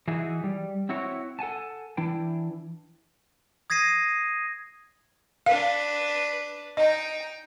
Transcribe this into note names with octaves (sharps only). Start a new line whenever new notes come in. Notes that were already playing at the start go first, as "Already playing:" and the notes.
E3 D#4 E4 F#4 G#4
G3
C4 E4 F#4 C#5
A4 F#5 G#5 A5
E3 D4 E4 G5
D#6 G#6 A#6 C7 D#7
D4 B4 F5
D#4 D#5 G5